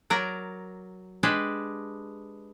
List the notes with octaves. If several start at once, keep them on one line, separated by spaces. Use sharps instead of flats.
F#3 A#4 D5 A#5
G#3 D4 G4 B4